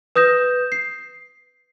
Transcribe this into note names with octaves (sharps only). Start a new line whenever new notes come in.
B4 D#6 G6 A#6 E7
C7